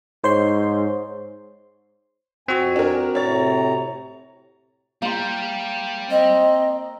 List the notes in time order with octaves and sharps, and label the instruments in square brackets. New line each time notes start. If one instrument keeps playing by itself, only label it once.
[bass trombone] G#2 [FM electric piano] C5 C#5 C6
[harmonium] F2 G#5 [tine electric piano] C4 F#4
[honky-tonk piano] D4 A#4
[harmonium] A2 C3 A#5 [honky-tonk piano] C#5 A6
[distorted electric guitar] G3 [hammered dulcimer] A#3 C6
[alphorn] C4 [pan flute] D#5